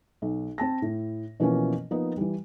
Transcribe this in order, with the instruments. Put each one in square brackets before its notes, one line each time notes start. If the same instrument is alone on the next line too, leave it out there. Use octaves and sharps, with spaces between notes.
[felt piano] B1
C4 A5 A#6
A2
B2 E3 F3 A#3 B3 C#4
F3 A#3 B3 D#4
E3 G3